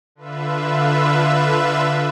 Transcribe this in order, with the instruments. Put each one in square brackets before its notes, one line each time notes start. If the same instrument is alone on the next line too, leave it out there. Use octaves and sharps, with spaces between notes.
[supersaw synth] D3 F4 B4 E5